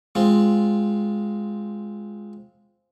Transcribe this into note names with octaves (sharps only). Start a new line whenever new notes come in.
G#3 C4 F4